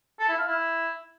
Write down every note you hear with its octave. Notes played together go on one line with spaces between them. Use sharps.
A4
E4
F5
E4